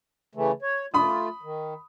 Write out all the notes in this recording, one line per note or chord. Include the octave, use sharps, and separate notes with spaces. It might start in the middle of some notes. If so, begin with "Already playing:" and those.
C#3 E3 A3
C#5
A3 F4 B5 D#6
D#3